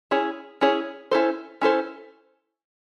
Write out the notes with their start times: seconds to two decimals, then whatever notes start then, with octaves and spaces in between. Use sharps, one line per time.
0.11 C#4 E4 G#4 C#5
0.61 C#4 E4 G#4 C#5
1.11 C#4 E4 A4 C5
1.61 C#4 E4 A4 C5